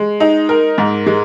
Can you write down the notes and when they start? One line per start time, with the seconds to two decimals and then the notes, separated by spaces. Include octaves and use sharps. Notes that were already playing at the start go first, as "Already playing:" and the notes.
Already playing: G#3
0.20 D#4
0.49 A#4
0.78 G#2
1.06 G#3